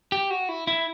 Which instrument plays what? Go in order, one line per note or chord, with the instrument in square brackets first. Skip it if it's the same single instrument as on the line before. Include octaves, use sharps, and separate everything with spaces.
[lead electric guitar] G4
F#4
E4
E4